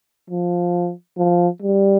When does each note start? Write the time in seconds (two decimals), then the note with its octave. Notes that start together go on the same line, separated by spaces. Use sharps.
0.30 F3
1.18 F3
1.62 G3